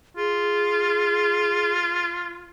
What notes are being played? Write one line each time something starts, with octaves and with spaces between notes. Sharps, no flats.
F4 G#4